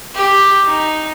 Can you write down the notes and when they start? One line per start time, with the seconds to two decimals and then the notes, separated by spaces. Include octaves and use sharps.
0.15 G4
0.66 D#4